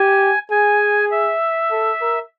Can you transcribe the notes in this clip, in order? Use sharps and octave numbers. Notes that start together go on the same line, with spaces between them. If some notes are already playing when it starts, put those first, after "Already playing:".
Already playing: G4 G#5
G#4 G#5
E5
A4
A#4